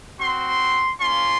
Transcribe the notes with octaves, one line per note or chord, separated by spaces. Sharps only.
C4 F#4 C6
A#3 C#4 F4 C6